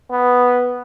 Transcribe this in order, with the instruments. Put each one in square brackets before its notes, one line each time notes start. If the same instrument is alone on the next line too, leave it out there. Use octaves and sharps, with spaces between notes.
[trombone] B3